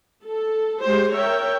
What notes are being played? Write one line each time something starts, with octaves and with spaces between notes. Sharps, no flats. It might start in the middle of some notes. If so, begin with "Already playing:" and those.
A4
G#3 G4 C5
A#4 C#5 E5 G5